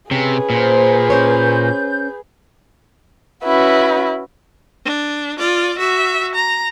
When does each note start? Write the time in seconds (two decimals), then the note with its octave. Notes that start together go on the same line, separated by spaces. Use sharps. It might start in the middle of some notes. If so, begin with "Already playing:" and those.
0.11 C3 C#4 G#4 B4
0.50 A#2 C5
1.10 C#4 C5 C#5 G6
3.44 C#4 E4 F#4 B4
4.85 D4
5.38 F4 D5
5.78 F#4 E5
6.35 A#5